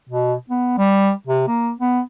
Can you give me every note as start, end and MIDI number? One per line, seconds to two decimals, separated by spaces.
0.09 0.34 47
0.50 0.77 59
0.78 1.11 55
1.27 1.44 48
1.48 1.71 58
1.80 2.00 59